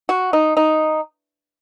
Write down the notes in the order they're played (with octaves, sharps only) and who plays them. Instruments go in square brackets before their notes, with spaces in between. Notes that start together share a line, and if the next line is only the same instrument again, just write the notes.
[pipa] F#4
D#4
D#4